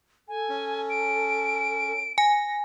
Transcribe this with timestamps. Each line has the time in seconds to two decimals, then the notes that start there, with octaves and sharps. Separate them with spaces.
0.28 A4 G#5
0.49 C#4
0.90 D7
2.18 G#5 A#6